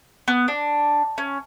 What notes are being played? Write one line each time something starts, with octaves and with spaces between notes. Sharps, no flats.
B3
D4
C#4